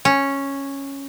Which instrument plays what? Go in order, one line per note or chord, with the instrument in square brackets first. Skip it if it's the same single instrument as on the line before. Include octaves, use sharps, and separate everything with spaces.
[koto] C#4